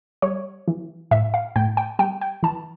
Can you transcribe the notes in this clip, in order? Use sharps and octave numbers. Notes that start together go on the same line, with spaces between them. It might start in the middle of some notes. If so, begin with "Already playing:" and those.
G3 C#5
E3
A2 E5
F5
A2 G5
G5
G3 G5
G5
E3 A5